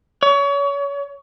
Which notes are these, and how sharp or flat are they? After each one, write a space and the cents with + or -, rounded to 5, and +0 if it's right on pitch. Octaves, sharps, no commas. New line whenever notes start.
C#5 +30